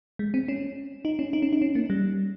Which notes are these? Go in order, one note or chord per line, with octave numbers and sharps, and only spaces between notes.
G#3
C4
C#4
D#4
C#4
D#4
C#4
D#4
C#4
A#3
G3